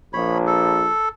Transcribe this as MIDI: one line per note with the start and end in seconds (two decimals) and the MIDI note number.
0.13 0.89 34
0.13 0.38 73
0.13 0.38 83
0.47 1.09 69